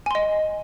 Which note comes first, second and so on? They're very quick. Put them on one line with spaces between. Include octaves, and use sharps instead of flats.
G#5 C6 D#5